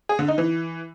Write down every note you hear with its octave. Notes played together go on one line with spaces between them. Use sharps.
G#4
D3
D#4
E3